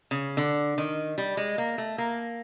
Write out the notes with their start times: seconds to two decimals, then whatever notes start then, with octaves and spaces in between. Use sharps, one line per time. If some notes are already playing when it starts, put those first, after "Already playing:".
0.11 C#3
0.37 D3
0.78 D#3
1.18 G3
1.37 G#3
1.58 A#3
1.78 A3
1.98 A#3